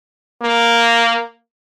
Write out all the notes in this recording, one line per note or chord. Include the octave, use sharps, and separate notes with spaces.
A#3